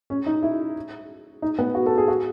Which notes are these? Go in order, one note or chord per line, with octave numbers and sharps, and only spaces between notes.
C#4
D#4
E4
D#4
B3
F#4
A4
G#4
F#4